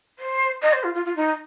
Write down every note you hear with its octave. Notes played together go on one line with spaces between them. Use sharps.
C5
D#5
C5
F4
F4
F4
D#4